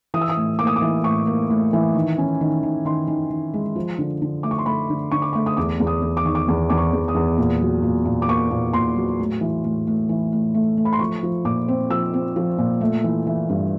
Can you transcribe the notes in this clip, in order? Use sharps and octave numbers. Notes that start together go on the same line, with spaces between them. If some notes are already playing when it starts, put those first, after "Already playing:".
E3 D#6
E6
D#6
A2
A#3 D6
D#6
D6
E3
A2 C#6
A#3
A2
E3
D#3
C#4
D#3
D#3
D#3 C6
D#3
D#3
G#3
F3
D3
D3
A3 D6
C#6
C6
A3 B5
D3
D3 C#6
D6
A3 C#6
D#6
E2 D6
E2
D#6
E2
D6
D#3 C#6
D6
E2
E2 D6
C#6
E2
D#6
E2
A#2
F#3
A#2
A#2
D6
A#3 C#6
A#2
A#2 C6
F#3
A2
E3
A2
A2
E3
A2
A3
A3
B5
C6
F3 C#6
F3
A#2 D6
C4
F3 E6
C4
F3
A#2
A3
E3
E3
G2